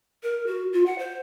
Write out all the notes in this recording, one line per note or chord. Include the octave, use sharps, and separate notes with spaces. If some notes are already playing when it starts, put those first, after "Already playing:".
A#4
F#4
F4
F#5
C5